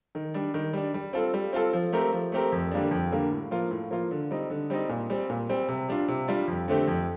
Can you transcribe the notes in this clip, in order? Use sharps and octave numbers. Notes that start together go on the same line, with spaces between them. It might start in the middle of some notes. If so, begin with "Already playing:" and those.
D#3
G3 D4
D#3
G3 D4
G3
C4 F4 A4
G3
C4 F4 A4
F3
A3 C4 G4 A#4
F3
A3 C4 G4 A#4
F2
D3 G3 A#3 D4
F2
D3 G3 A#3 D4
A2
F3 A#3 F4
A2
F3 A#3 F4
D3
G3 C4 D#4
D3
G3 C4 D#4
A#2
G3 C4
A#2
G3 C4
C3
G3 D4 F4
C3
G3 D4 F4
F2
D3 A3 C4 G4
F2